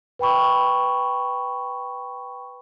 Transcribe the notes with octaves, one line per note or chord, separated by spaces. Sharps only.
B4 G5 B5 C#6